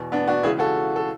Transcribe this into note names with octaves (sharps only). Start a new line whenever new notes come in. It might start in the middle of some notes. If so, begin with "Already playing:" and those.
Already playing: E2 B2
B3 D4
D4 F#4
C#2 C#3 E3 E4 G#4
F#4 A4
A4